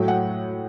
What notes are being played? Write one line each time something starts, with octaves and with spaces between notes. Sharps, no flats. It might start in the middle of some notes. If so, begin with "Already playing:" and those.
Already playing: A2 F#3 A3 G5
F#5